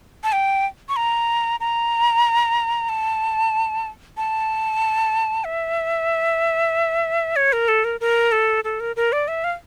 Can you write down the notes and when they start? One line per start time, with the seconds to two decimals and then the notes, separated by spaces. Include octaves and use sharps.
0.24 A5
0.32 G5
0.89 C#6
0.96 A#5
1.60 A#5
2.89 A5
4.17 A5
5.44 E5
7.36 C#5
7.53 A#4
7.68 A4
7.84 A#4
8.01 A#4
8.32 A4
8.64 A4
8.80 A#4
8.96 A#4
9.12 D5
9.28 E5
9.44 F5